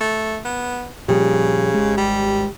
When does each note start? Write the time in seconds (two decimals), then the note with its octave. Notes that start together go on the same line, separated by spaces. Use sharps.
0.01 A3
0.45 B3
1.08 A#2 C#3 F3 G3 G4
1.74 G#1 G#3
1.97 G3